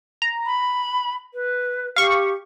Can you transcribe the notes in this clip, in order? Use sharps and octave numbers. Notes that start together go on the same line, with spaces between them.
A#5
B5
B4
G4 F5 C#6